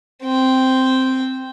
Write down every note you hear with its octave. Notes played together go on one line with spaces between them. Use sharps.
C4 G5